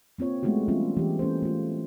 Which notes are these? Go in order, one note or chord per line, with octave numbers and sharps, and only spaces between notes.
A#3 C4 F4 C#5
F#3 G#3 A3 B3 E4 F#4
E3 G3 B3 C#4 E4 F4
E3 G4
A#3 C#4 A4 C5
A3 F4